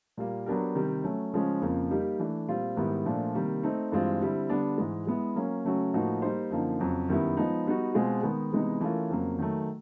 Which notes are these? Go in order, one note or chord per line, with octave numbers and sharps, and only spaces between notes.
A#2 G3 A#3
F#3 B3 D4 G4 A#4
C3 D#3 G3
F#3 A3 C#4
C#3 F3 G#3 C#4
F2 C#3 F3 A#3
G3 A#3 D#4 G4
E3 A3 D4
A#2 G3 C4 F4
G#2 D#3 G3 B3 E4
A#2 F3 A3 D4
C3 D#3 G3 A#3
A3 C4 D#4
G2 E3 G#3 C4 F4
D3 G3 C4 E4
D3 G3 B3 D4
G#2 E3 G#3
G#3 B3 E4
F#3 A#3 C#4
C#3 F#3 A3 C#4 F#4
A2 F3 A#3 D#4 F#4
G3 A#3 D#4 G4 C5
F#2 D3 F3 A#3 D#4
F2 C#3 F#3
F#2 D#3 G3 B3 E4
F3 G#3 B3 D#4
G3 B3 D#4 F#4
B2 G#3 C4 F4 G#4
D#3 G#3 B3
C3 E3 G#3 B3 D#4
E3 A3 C#4 F4 A#4
F2 C#3 F#3 A#3
D#3 F#3 A3